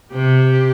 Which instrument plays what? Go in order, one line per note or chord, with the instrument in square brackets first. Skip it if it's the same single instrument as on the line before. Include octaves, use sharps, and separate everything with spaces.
[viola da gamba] C3 [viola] G4